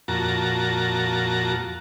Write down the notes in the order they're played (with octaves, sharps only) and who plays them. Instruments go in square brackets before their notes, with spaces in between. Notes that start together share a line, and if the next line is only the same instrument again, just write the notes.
[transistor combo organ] F2 A#2 F#4 A5 A#5